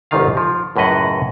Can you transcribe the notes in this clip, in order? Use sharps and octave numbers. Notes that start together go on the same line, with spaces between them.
G1 C2 G#2 D#3 F4 F5
F3
C#2 F#2 A2 B4 D#5 F#5